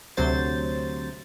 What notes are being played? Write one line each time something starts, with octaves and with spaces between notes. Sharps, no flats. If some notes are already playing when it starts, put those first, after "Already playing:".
D2 C3 F#3 C5 A6